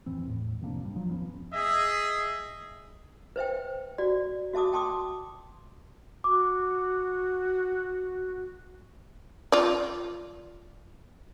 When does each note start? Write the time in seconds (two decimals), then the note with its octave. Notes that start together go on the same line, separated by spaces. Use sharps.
0.06 D1 F2 E3 C4
0.24 E2 A2
0.61 F2 C3 A#3 D4
0.82 B1 G2 G3
0.96 G2 F3 F#3
1.11 D#2 F3 B3 C#4
1.53 G#4 D#5 E5
3.36 B4 C5 E5 G5
3.98 F#4 D5
4.54 F#4 E5 A5 D6 D#6
4.73 G5 A5 C6 D6 D#6
6.24 F#4 D6
9.52 F4 D5